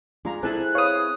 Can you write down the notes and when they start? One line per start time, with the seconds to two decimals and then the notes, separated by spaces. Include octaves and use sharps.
0.25 G#3 D4 F4 A#5
0.43 C4 E4 G#4 A4 G#5 A5 F#6
0.75 B4 C#5 F5 D#6